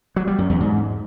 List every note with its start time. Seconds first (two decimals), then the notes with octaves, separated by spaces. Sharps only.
0.16 F#3
0.27 G3
0.38 F#2
0.49 E2
0.60 G#2